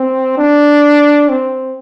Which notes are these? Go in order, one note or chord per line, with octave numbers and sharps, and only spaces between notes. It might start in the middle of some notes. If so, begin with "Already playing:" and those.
Already playing: C4
D4
C4